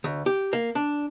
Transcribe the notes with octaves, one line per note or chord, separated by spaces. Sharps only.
D2
G4
A#3
D4